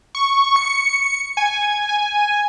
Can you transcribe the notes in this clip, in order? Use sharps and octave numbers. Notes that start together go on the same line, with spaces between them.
C#6
C#7
G#5
G#5